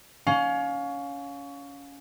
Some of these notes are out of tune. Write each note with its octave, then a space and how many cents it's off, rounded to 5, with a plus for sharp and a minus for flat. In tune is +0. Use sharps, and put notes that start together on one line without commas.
C#4 +20 F5 +25